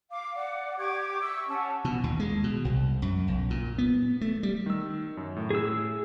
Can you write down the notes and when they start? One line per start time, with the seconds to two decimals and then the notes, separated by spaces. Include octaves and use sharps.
0.10 F5 D6
0.35 D5 F#5 D6
0.77 G4 C#6 D6 G#6
1.21 E5 C#6 E6
1.48 C#4 F#5 A5
1.85 B2
2.04 D#2
2.20 G#3
2.44 B2
2.65 C2
3.02 F#2
3.28 B1
3.50 A#2
3.78 B3
4.21 A3
4.43 G3
4.66 D#3 E6
5.17 F#2
5.36 A2
5.50 G#4 E6